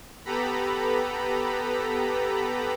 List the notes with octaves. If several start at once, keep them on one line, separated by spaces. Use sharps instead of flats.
B3 G4 A4 B4 A#5 B5